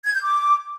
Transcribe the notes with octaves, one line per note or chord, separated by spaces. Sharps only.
G#6
G6
D6